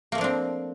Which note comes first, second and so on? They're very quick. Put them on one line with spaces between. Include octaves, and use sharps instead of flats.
A#3 A3 F3 D4 C4